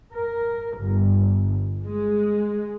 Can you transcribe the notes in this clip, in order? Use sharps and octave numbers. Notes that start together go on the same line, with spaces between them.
A#4
G1
G#3